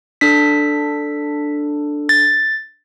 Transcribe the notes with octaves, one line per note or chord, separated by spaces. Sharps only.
D4 A4 B6
A6